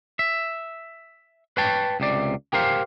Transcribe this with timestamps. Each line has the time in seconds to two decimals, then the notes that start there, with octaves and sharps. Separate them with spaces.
0.19 E5
1.57 B4 C#5 G5 A5
2.00 C#2 C3 D5
2.53 G4 A#4 C5 F5